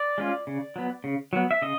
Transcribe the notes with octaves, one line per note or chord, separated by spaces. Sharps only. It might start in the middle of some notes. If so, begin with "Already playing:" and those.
Already playing: D5
G#3 C#4 F4
C#3
F#3 B3
C#3
F#3 B3
E5
C#3 D#5